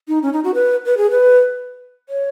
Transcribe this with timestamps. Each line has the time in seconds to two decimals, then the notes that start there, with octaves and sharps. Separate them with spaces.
0.08 D#4
0.23 C#4
0.33 D#4
0.44 F#4
0.54 B4
0.86 B4
0.97 G#4
1.11 B4
2.09 C#5